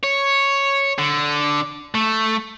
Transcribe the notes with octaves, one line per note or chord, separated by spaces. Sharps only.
C#5
D3
A3